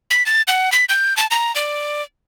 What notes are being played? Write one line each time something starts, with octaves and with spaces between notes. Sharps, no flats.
B6
A6
F#5
B6
G6
A5
A#5
D5